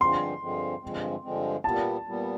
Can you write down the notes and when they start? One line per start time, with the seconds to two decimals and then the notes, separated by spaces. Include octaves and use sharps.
0.01 G2 D3 F3 G#3 C4 C6
0.42 G2 D3 F3 G#3 C4
0.82 G2 D3 F3 G#3 C4
1.23 G2 D3 F3 G#3 C4
1.64 A#2 G3 B3 A5
2.05 A#2 G3 B3